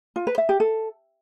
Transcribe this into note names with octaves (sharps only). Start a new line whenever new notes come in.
F4
B4
E5
G4
A4